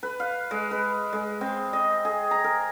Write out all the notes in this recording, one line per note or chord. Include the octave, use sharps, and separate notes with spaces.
B4
F5
G#3
B4
G#3
C4
D#5
G#4
A#5
A#4